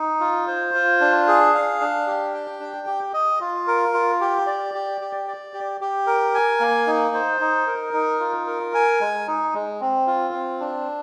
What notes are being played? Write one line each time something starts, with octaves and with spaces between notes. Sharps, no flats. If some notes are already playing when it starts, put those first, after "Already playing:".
Already playing: D#4
F4
C5
F4
D4
G#4
F5
D4
G4
G5
D4
G4
D#5
F4
A#4
F4
G4
D5
G4
G4
D5
G4
G4
A#4
G#5
A#3
D#4
C5
D#4
A#4
D#4
F4
A#4
G#5
G#3
D#4
G#3
C4
F4
C4
D4